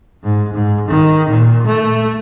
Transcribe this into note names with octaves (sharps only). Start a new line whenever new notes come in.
G#2
G#2
D#3
A#2
A3